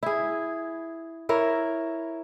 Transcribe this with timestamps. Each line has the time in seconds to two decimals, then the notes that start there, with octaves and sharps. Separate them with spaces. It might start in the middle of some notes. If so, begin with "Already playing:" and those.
0.03 E4 G#4
1.29 E4 A#4 C#5